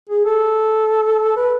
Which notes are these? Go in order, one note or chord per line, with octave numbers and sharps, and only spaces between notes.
G#4
A4
B4